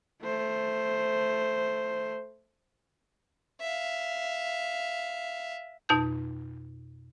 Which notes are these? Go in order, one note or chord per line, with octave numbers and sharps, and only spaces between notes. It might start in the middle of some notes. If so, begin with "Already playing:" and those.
A3 C5
E5 F5
F2 B2 D#4 A5 G6